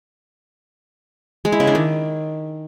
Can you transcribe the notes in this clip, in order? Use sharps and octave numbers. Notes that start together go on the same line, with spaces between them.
G#3
E4
C#3
D4
D#3